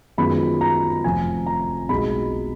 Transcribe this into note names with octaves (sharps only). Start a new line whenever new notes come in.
F#2 D#3 G#3 B3 F4 B5
A#5
F1 F2 F3 G#5
A#5
B1 B2 G#3 D#4 B5